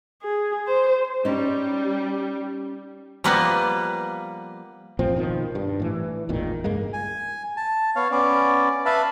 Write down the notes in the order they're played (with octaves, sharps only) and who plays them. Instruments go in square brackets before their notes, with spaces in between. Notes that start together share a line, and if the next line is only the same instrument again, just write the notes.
[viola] G#4
C5
[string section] G3 [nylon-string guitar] C#4 D#4
[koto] F3 G3 A#3 B3 B4
[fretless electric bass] A1 A#2 F3 C4
B2 D#3 F3
G2
A2 E3
G#1 E2 A#2 D#3
C#2 G2 G#3 A#3
[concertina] G#5
A5
B3 C#5 F5
B3 C#4 D5
B4 E5 F5 A5 B5